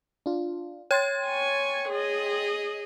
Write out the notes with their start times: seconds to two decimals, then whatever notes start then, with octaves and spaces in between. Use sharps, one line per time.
0.26 D4 F4
0.91 C#5 G5 C6 G#6 A6
1.26 G#5 C#6
1.89 G#4 D#5